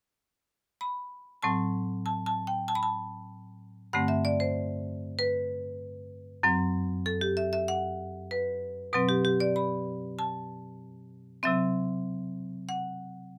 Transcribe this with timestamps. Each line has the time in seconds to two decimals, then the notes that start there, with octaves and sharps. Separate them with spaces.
0.81 B5
1.43 A2 F#3 C4 A5
2.06 A5
2.26 A5
2.47 G5
2.68 A5
2.75 B5
2.83 A5
3.93 G2 D3 A3 C4 F#5
4.08 E5
4.25 D5
4.40 C5
5.19 B4
6.43 F#2 F#3 C4
7.06 A4
7.21 G4
7.37 E5
7.53 E5
7.68 F#5
8.31 B4
8.93 B2 F#3 C4 B4
9.09 G4
9.25 G4
9.40 D5
9.56 B5
10.19 A5
11.43 C3 F#3 C4 E5
12.69 F#5